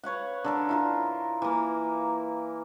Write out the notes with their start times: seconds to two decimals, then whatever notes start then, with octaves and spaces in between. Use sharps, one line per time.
0.03 B4 C#5 F5 F#5
0.44 D3 A4 A#4
0.69 E4 F4 A#4
1.42 E3 A#3